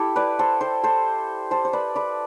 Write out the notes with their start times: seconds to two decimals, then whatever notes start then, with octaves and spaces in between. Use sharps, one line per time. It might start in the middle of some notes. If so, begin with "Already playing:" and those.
Already playing: E4 G4 A4
0.16 B4 D5
0.39 A4 C5
0.61 A4 C5
0.83 A4 C5
1.51 A4 C5
1.65 C5
1.73 B4 D5
1.96 B4 D5